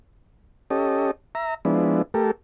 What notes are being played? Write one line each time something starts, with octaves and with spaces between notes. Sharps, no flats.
C#4 G4 A4 D#5
E5 A#5
F3 G#3 B3 D4 E4
A3 G4 A4 A#4